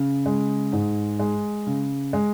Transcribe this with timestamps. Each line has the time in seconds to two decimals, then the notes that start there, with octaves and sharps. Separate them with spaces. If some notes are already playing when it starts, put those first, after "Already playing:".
Already playing: C#3
0.26 G#3
0.73 G#2
1.19 G#3
1.67 C#3
2.13 G#3